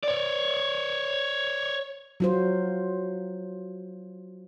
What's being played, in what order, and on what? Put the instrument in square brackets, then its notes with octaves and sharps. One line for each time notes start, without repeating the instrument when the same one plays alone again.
[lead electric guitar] C#5 D5
[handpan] F#3 F4 C5